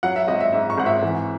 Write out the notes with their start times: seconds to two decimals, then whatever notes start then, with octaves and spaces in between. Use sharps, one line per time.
0.03 F#3 F#5
0.16 E5
0.28 G#1 D#5
0.40 E5
0.53 G#2 E5
0.70 C#6
0.78 G#1 F#5
0.86 E5
1.02 E3